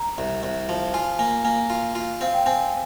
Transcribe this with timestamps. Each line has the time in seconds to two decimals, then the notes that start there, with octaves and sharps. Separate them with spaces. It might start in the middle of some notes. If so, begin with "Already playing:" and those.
Already playing: A#5
0.18 C2
0.43 C2
0.69 F3
0.94 F4 G#5
1.19 A#3 G#5
1.45 A#3 G#5
1.70 F4
1.95 F4
2.21 C4 F5
2.34 G5
2.46 C4 G#5